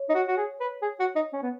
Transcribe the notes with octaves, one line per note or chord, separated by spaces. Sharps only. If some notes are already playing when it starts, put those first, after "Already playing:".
Already playing: C#5
D#4
F#4
F#4
G#4
B4
G#4
F#4
D#4
C#4
B3